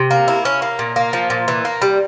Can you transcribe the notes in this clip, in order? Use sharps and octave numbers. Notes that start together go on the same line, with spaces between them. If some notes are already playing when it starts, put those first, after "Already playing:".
Already playing: C3
A#3
E4
C#4
A#3
A#2
A#3
F3
A#2
E3
A#3
G3